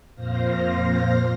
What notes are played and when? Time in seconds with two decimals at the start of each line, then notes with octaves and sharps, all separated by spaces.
0.15 F2 A#2 C5 F5 A#6